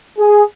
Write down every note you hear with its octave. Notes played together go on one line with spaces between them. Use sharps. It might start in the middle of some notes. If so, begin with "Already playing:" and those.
G#4